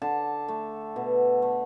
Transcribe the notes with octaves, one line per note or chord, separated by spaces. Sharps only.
D3 A5
A3
B2
A3